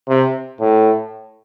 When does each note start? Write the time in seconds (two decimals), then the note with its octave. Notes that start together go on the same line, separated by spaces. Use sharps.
0.08 C3
0.60 A2